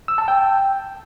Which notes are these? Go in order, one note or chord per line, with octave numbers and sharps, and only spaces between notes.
E6
A5
G5